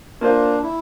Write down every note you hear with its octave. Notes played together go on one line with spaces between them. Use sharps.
A#3 D4 F4 C5
E4